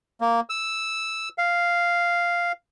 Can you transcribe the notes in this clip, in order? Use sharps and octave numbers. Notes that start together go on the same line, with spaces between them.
A#3
E6
F5